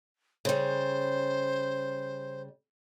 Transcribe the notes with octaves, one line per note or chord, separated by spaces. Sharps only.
C#3 G3 C5